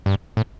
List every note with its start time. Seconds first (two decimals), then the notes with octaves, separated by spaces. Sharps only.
0.06 G2
0.37 A2